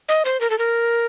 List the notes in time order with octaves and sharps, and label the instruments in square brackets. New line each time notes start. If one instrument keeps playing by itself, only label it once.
[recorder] D#5
C5
A#4
A4
A#4